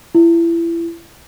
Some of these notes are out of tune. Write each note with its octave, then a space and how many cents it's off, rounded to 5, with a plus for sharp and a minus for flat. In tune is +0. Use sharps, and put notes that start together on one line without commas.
E4 +30